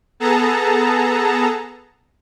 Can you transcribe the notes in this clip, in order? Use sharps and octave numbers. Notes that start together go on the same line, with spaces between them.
B3 G#4 A4 A5 A#5